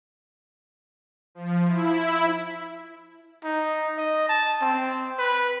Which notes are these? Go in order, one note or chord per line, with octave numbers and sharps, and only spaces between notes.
F3
E4
D#4
D#5
A5
C4
B4